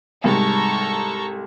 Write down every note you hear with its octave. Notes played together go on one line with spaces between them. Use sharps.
C2 G#2 A4 A#5 C#6